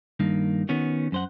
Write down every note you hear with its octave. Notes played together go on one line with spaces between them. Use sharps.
G2 D#3 A#3
D#3 B3 C#4 F#4
F#2 C5 F#5